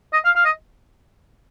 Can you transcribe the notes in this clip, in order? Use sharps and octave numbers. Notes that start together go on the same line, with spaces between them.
D#5
F5
F5
D#5